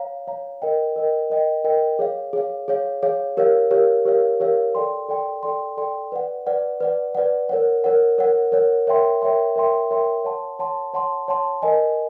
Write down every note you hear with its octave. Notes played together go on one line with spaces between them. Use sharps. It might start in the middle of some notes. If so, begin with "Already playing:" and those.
Already playing: C#5 F5 A#5
C#5 F5 A#5
A#4 D#5 G5
A#4 D#5 G5
A#4 D#5 G5
A#4 D#5 G5
G#4 C#5 F5
G#4 C#5 F5
G#4 C#5 F5
G#4 C#5 F5
G4 A#4 C#5 F5
G4 A#4 C#5 F5
G4 A#4 C#5 F5
G4 A#4 C#5 F5
A4 D5 G5 C6
A4 D5 G5 C6
A4 D5 G5 C6
A4 D5 G5 C6
B4 D5 F#5
B4 D5 F#5
B4 D5 F#5
B4 D5 F#5
A#4 C#5 F#5
A#4 C#5 F#5
A#4 C#5 F#5
A#4 C#5 F#5
A#4 C#5 E5 G5 C6
A#4 C#5 E5 G5 C6
A#4 C#5 E5 G5 C6
A#4 C#5 E5 G5 C6
C#5 F#5 A5 C6
C#5 F#5 A5 C6
C#5 F#5 A5 C6
C#5 F#5 A5 C6
A#4 D#5 G#5